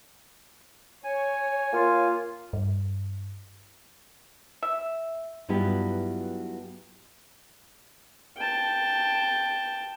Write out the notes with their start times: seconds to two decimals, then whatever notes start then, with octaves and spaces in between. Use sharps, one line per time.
1.04 C#5 G#5
1.73 A#3 F4
2.53 G2
4.62 E5
5.49 G2 F#3 B3 E4 F4 G4
8.38 G5 A5